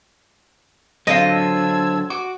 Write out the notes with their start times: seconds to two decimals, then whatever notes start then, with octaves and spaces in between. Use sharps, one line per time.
1.07 D3 F#3 C4 D4 E4 F4 D#5
1.31 A5 E6 G#6
2.10 F#4 D6